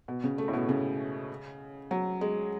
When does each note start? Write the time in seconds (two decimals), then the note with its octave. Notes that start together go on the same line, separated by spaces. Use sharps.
0.08 B2
0.24 C#3
0.38 A3
0.48 A2
0.53 B2
0.69 C#3
1.91 F#3
2.21 G#3